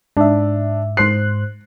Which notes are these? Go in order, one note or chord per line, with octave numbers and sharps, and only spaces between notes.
G#2 D4 E5
G#2 C5 F#6 C7